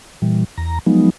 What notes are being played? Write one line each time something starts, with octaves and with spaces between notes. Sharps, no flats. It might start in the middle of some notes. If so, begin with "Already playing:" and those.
A#2 E3 G3
E2 A#5
F3 F#3 G#3 B3 D#4